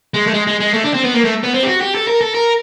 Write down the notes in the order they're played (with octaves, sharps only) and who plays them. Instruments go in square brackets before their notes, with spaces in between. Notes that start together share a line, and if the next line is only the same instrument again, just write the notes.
[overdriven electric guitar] G#3
A3
G#3
G#3
G#3
A3
D4
C4
B3
A#3
A3
B3
C4
G4
F#4
G4
A4
A#4
A4
A#4